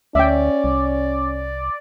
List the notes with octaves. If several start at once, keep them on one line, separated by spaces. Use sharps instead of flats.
D2 C#4 D5 E5 G5
C2